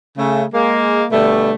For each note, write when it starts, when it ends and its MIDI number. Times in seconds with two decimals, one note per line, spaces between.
0.18 0.44 49
0.18 0.44 57
0.54 1.05 56
0.54 1.05 58
1.11 1.53 47
1.11 1.53 50
1.11 1.53 55
1.11 1.53 57